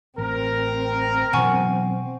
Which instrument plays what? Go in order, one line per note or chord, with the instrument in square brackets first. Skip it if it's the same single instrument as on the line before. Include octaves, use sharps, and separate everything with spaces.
[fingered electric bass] A1 [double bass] C4 [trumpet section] A#4
[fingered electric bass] B2 E3 F#3 [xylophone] F#5 G#5 C#6